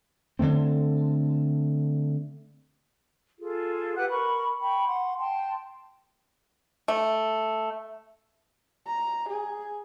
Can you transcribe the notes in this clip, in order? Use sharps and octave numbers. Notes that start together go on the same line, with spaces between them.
D3 F3 A3 C4
F4 G#4 A4
G4 B4 F#5 F#6
A#4 B5 C#6
G5 B5 C#6
F#5 C6
G5 A5 C6
A3
A#5
G#4